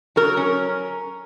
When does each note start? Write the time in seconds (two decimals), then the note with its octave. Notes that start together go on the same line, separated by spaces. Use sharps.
0.16 F#3 A#4
0.37 C#4